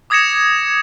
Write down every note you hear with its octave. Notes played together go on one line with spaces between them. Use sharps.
D6 D#6 G#6 A#6 C#7 E7